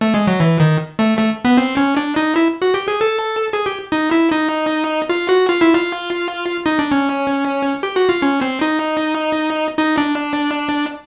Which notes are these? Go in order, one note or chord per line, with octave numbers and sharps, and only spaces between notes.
A3
G#3
F#3
E3
D#3
A3
A3
B3
C4
C#4
D4
D#4
E4
F#4
G4
G#4
A4
G#4
G4
D#4
E4
D#4
F4
F#4
F4
E4
F4
D#4
D4
C#4
G4
F#4
F4
C#4
C4
D#4
D#4
D4